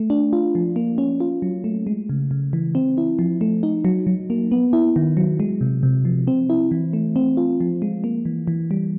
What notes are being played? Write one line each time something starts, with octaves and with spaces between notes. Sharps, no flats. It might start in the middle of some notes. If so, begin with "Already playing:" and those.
Already playing: A3
D4
F4
F3
A#3
C#4
F4
F#3
A3
G#3
C#3
C#3
E3
C4
E4
F3
A3
D#4
F#3
F#3
A#3
B3
E4
D#3
F#3
G#3
C3
C3
F3
C4
E4
E3
A3
C4
F4
F3
G#3
A#3
E3
E3
G3